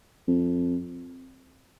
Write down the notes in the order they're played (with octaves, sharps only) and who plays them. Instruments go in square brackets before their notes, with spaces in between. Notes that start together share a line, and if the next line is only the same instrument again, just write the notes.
[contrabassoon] F2